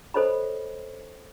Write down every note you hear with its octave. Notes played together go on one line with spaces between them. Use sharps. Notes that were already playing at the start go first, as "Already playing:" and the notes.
A4 C5 C#5 D#5 B5